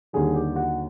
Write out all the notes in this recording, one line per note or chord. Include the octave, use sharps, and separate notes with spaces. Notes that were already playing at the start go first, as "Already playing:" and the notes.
D#2 D3 G3 G#4
G4
F#4